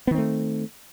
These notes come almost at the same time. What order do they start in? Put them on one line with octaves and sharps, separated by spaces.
B3 D#3 C4 A3